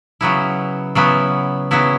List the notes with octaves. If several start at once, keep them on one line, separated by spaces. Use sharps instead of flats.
C#3 F#3 B3 E4
C#3 F#3 B3 E4
C#3 F#3 B3 E4